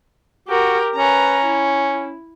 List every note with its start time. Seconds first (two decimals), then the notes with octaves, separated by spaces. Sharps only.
0.48 F#4 G4 A#4
0.96 C#4 B4 A#5
1.45 E4